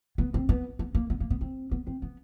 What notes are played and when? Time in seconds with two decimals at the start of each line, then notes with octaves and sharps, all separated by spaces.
0.18 B3
0.34 C4
0.49 B3
0.79 B3
0.95 A#3
1.10 B3
1.20 A#3
1.30 B3
1.41 C4
1.71 B3
1.87 C4
2.02 B3